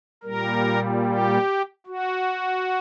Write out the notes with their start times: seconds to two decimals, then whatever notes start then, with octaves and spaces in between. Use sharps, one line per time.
0.23 A#2 G3 A#4
1.05 G4
1.86 F#4